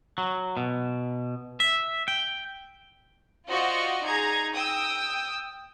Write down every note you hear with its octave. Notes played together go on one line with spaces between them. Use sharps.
F#3
B2
E5
G5
F4 F#4 C5 D5 D#5 C#6
D#4 G#4 A#5 G#6
G5 D#6 E6